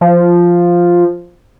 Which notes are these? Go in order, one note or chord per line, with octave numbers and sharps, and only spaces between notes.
F3